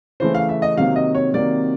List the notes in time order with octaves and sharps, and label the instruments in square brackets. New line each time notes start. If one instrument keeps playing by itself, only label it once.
[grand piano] C#3 E3 A3 C5
F5
E5
D#5
C3 D#3 F#3 A#3 F5
D#5
C#5
C3 D#3 F#3 A#3 D5